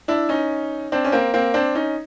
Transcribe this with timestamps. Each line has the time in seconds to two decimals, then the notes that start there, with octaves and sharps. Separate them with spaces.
0.08 D4 E4
0.29 C#4 D#4
0.92 C4 D4
1.04 C#4
1.12 A#3 C4
1.34 A#3 C4
1.54 C4 D4
1.75 C#4 D#4